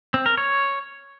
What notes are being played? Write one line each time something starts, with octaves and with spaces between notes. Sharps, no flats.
C4
A#4
C#5